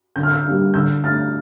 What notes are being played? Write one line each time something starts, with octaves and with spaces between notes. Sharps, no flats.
D3 G6
F6
E6 G6
G3 A#3 D4
D3 E6 G6
A3 D4 F6 A6